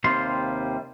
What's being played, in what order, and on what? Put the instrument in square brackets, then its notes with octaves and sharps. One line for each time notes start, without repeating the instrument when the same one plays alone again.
[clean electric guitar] D#2 C3 G3 F4 C6